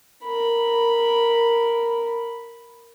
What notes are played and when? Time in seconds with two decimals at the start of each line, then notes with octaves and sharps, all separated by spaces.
0.24 A#4 B5